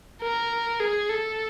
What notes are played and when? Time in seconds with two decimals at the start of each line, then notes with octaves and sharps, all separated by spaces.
0.22 A#4
0.80 G#4
1.09 A4